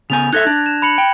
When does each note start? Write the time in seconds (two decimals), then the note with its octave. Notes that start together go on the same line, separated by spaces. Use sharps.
0.10 C#3 B3 G#5 G6 F7
0.33 D#4 A4 E5 F#6 G#6 A#6
0.47 D4
0.66 E7
0.82 B5 C#7 F#7
0.98 G5